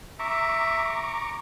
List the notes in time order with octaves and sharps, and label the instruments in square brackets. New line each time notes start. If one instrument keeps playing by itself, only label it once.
[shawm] E5 [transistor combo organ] A#5 C#6 D6